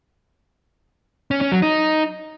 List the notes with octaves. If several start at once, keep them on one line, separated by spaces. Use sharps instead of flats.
C#4
C#4
F#3
D#4